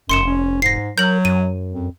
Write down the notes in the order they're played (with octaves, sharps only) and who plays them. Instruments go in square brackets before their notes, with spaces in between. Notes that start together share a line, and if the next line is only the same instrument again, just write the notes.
[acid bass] F1 [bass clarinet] F#2 [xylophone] C6 C#7 E7
[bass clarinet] C#4
[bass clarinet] G#2 [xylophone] A#6 C7
[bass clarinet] F#3 [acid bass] A#4 [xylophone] G6 F#7
[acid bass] F#2 [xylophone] D#7
[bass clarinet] F2